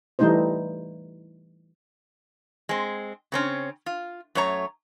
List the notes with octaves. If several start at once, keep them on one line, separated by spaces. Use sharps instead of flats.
E3 G3 A3 D#4 E4 C5
G#3 C4
C#3 C4 C#4
F4
F#2 A3 C#5 A#5